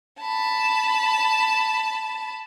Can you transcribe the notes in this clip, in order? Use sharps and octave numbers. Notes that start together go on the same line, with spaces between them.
A5 B5